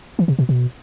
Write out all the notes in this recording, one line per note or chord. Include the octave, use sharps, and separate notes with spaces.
E3
C3
B2
B2